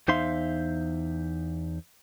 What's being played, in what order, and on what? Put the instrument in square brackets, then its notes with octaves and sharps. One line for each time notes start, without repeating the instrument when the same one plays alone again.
[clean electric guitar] E2 D#4 C5 E5 F5 C6